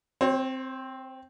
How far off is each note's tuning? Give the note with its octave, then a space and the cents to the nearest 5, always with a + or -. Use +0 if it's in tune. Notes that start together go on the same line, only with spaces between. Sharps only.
C4 +0 C#5 -45